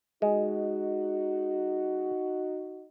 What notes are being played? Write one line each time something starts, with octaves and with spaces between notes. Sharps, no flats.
G#3 D#4 F#4